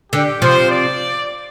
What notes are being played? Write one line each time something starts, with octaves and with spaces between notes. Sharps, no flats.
D3 G4
C3 F3 C5
D5